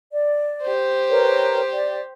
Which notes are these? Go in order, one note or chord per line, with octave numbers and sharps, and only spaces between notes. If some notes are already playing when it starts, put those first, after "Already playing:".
D5
G4 C5
A#4 B4 C#5
D5